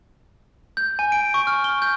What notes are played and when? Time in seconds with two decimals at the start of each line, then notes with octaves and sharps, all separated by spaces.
0.77 G6
0.99 G#5
1.12 D7
1.34 C#6
1.47 F6
1.64 G7
1.82 G6